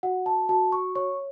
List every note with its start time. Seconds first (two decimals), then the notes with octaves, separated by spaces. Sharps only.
0.03 F#4 F#5
0.26 A5
0.49 F#4 A5
0.72 C#6
0.95 C#5 C#6